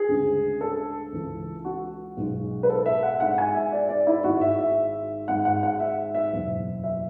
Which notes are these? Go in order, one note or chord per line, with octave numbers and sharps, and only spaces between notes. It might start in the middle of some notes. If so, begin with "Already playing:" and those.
Already playing: G#4
D2 C#3 G#3 C#4
A4
C#2 C#3 E3
F#4
B1 B2 G#3
B4
A4
E5
F#5
G#2 G#3 D4 F#5
G#5
E5
D5
D5
E4
G#1 G#2 G#3 F#4
E5
E5
G#1 G#2 G#3 F#5
F#5
F#5
E5
E5
F#1 E2 B2
E5